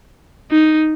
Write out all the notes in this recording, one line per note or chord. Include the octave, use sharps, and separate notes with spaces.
D#4